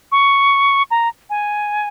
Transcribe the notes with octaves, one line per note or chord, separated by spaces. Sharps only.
C#6
A#5
G#5